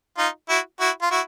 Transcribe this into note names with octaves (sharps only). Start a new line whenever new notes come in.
D#4 F4
E4 F#4
E4 F#4
F4
E4 F#4